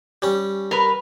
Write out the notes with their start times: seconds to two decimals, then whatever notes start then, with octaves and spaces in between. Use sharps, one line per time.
0.22 G3 C#4
0.71 A#4 B4